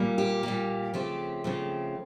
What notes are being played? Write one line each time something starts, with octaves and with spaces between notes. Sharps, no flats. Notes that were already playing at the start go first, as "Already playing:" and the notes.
Already playing: A#2 G3 A#3
G4
A#2 G3 A#3
C#3 F3 A3 C4 G4
C#3 F3 A3 C4